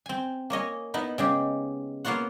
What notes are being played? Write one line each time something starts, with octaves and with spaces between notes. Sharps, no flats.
C4 G#5
A#3 C#5 D#5 G#5
B3 D#4 E4
C#3 G#3 G4
A#3 B3 F4 C#5 F#5